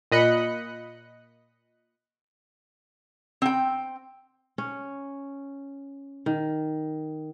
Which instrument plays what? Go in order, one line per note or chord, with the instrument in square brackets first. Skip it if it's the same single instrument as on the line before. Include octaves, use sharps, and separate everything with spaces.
[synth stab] A#2 D#5 B5 F#6 C#7
[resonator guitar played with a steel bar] C4 G5
[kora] C#4
D#3